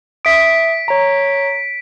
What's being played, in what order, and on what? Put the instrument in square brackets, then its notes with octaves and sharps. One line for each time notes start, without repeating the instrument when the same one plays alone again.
[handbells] E5 D#6 [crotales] B6 D7
[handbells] C#5 A#5